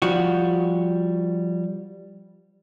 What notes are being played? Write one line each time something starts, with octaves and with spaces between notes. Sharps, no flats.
F3 G3 F#4